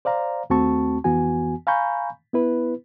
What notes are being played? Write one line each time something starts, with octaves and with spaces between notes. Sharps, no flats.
C5 D5 F5 A#5
D#2 A3 C4 F#4 A5 C#6
F2 E3 B3 F#4 G#5
F5 G#5 A#5 B5 C#6 G6
B3 E4 B4